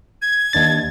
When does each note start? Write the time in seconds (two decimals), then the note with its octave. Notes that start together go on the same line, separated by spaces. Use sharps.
0.22 G#6
0.53 D#2 D4 A6